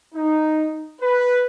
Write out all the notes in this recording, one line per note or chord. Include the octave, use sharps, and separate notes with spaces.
D#4
B4